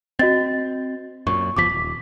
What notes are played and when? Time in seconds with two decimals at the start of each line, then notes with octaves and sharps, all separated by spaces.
0.19 C4 F#4 D#5 A6
1.27 F#2 A#2 C#6
1.57 F#1 E2 F3 D6 B6
1.70 D#1